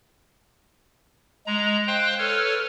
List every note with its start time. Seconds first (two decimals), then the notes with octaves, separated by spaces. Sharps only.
1.47 G#3 A#5
1.87 C5 F5 G5 C6 F#6
2.18 A4 B4 C#5 F6